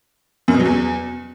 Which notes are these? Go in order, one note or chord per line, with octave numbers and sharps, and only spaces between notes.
F#2
B2
F#3
E2